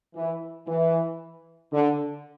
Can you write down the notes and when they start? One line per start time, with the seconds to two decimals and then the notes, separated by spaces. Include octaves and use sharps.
0.15 E3
0.67 E3
1.72 D3